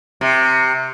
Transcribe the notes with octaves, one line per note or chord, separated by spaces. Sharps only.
C3